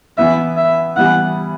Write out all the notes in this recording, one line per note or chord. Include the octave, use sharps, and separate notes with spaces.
E3 B3 E4 E5
E5
E3 G3 B3 E4 F#5